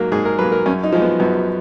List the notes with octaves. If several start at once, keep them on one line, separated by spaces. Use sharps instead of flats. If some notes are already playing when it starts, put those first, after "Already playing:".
Already playing: G#2 F#3 A#3
G#2 G#4
A#4
F#3 A#3 B4
A#4
F#2 C#4
D#4
F3 G#3
B3
F#2 B3